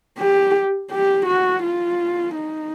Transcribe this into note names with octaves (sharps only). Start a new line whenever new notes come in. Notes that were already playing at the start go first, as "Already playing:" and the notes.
G4
G4
F#4
F4
D#4